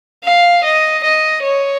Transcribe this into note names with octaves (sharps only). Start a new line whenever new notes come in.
F5
D#5
D#5
C#5